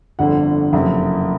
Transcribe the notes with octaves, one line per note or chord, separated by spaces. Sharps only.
G1 F2 D3 F#5
F#1 F2 C3